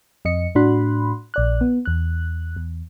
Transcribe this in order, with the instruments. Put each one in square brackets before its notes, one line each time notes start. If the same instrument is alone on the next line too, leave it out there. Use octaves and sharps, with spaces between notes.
[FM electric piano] F2 D#5 C#7
A2 D4 F#4 B5 C6 F#6
A#1 D5 F#6
B3
E2 F#6
E2